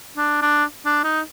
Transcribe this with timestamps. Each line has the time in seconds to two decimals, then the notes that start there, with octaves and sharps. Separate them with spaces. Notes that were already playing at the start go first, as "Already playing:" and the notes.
0.17 D4
0.42 D4
0.85 D4
1.04 D#4